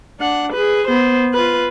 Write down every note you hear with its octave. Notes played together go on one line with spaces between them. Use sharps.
D4 F#5
G#4 B4
B3 C5
F4 B4